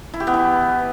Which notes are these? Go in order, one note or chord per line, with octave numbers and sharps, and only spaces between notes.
E4
G4
B3
E3